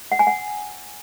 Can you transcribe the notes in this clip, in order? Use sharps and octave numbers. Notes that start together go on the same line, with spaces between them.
F#5
G#5
F#5